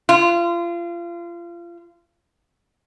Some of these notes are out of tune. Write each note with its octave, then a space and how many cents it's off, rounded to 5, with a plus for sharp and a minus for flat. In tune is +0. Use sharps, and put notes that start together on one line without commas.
F4 -30